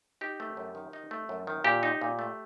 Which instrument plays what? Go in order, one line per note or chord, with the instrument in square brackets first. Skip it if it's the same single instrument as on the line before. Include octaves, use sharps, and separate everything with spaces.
[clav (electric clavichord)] D#4 G4
A3
F#2
D#3
D#4
A3
F#2
D#3
A#2 G4
D#4
A#2
A3